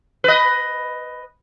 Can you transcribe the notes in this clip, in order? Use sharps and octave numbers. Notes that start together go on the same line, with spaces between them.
B4 D#5